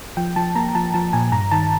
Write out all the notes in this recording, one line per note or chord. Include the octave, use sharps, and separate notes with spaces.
F3 G5
F3 A5
A#3 A#5
F3 A5
F3 A5
A#2 G#5
G2 A#5
D#3 A5